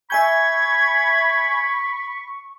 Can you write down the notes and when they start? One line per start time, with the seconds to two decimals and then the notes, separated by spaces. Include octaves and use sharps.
0.10 E5 G#5 B5 C#6 G6 G#6